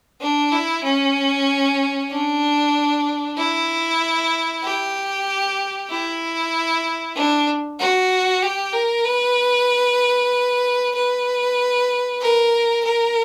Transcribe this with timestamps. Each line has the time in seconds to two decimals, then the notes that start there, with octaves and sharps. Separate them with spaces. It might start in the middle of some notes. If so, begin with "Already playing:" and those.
0.21 D4
0.52 E4
0.84 C#4
2.11 D4
3.37 E4
4.63 G4
5.90 E4
7.15 D4
7.79 F#4
8.42 G4
8.73 A#4
9.05 B4
10.95 B4
12.21 A#4
12.85 A#4